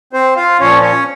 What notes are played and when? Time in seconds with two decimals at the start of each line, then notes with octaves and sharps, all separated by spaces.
0.13 C4 C5
0.36 F4 F5
0.60 A#2 F3 C#4 C#5
0.82 C#4 C#5